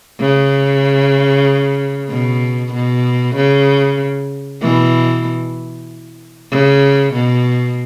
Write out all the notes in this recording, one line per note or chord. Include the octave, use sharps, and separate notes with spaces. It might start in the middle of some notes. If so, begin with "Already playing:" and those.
C#3
B2
B2
C#3
B2 E3
C#3
B2